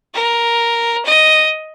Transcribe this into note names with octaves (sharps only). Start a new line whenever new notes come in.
A#4
D#5